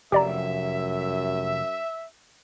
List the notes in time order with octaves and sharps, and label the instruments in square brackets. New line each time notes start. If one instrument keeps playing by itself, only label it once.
[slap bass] F1 [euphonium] F#2 [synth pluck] G4 D5 A#5 [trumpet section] E5